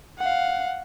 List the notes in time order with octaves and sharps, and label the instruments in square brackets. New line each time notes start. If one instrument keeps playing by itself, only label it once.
[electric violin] F5 F#5